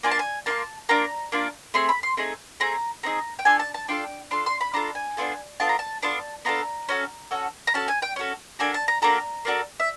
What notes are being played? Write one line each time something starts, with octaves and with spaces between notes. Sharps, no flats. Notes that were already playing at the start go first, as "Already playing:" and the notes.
A#3 D4 F4 G#5
A5
G#5
A#3 D4 F4 A5
A#3 D4 F4 A#5
A#3 D4 F4
A3 C4 G#4 C6
B5
C6
A3 C4 D#4 G#4
A3 C4 G#4 A#5
A3 C4 D#4 G#4 A#5
G5
D4 F4 A4 G#5
A5
A5
D4 F4 A4 G5
D4 F4 A4 C6
C6
B5
D4 F4 A4 A#5
G#5
B3 D4 F4 A4
B3 D4 F4 A4 A5
A#5
A5
B3 D4 F4 A4 A5
B3 D4 F4 A4 A#5
C#4 F#4 A4
C#4 F#4 A4
A#5
C#4 F#4 A4 A5
G#5
G5
C#4 F#4 A4
A#3 D4 F#4 A4 G#5
A5
A#5
A#3 D4 F#4 A4 A#5
A#3 D4 F#4 A4
E5